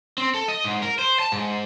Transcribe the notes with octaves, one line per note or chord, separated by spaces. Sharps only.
C4
A4
D#5
G#2
A#4
C5
A5
G#2